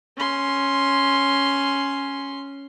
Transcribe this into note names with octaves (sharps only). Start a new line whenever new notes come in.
C#4 C6